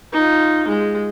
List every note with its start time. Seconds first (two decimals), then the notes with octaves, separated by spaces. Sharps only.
0.13 D#4 F4
0.68 G#3